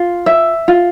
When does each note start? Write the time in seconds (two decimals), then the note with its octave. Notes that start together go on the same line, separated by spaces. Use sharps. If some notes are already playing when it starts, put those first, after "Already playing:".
Already playing: F4
0.26 E5
0.68 F4